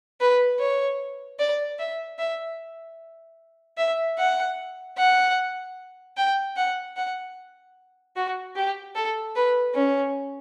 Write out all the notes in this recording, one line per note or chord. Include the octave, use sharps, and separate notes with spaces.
B4
C#5
D5
E5
E5
E5
F#5
F#5
G5
F#5
F#5
F#4
G4
A4
B4
C#4